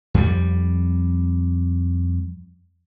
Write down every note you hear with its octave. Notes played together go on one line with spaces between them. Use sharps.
F2 G3